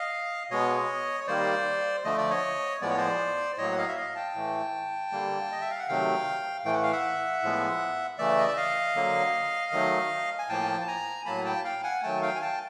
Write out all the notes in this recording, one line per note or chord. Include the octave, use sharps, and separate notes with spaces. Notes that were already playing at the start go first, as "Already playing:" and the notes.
Already playing: D#5 F5
B2 G#3 B3 C#5 D#5
C#5
D#3 G3 A#3 C5 D5
D3 F3 A3 D#5
D5
C#5 D#5
A2 F3 G#3 B3 D5
C#5
C5 D5
A2 F#3 A#3 C#5 D#5
F#5
D#5 F5
E5
D#5 F5
G5 A5
A2 E3 A3
D3 G3 A#3
D#5
E5
F5
F#5
C3 D#3 F#3 A3 F5 G5
A2 E3 A3 G5
F#5
F5
E5 F#5
A2 F3 G#3 B3
C#3 E3 A3 D5 E5
D#5
E5
D#5 F5
D3 F#3 A#3
D#3 F#3 A3
G#5
A2 F3 A#3 G5 A5
A5
G#5 A#5
A2 F#3 A#3 A5 B5
G5 A5
F5 G5
F#5 G#5
D#3 F#3 A3 G5 A5
F5 G5
G#5
G5 A5